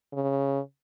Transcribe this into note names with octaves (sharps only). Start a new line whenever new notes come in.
C#3